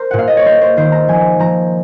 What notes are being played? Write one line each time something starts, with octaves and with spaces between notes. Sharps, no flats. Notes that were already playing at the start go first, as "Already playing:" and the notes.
Already playing: A#4 C5
A#2 F#5
F5
D#5
C#5
A#3 C5
C5
D#3 C5
A#5
F3 G#5
F3 A#5